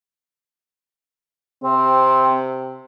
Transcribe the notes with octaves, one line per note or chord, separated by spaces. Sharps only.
C3 C4